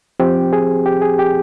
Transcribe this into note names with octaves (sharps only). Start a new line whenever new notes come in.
F3 C4 G4
G#4
G4
G#4
G4